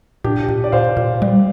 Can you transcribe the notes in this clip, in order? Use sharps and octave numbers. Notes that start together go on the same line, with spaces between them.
A#2 D4 G4
A#2
D5
A#2 C5 F5
A#2
G3